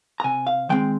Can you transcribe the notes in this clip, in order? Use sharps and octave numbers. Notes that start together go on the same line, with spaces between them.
A#5
C3 G#5
F5
D#3 G#3 C4 G5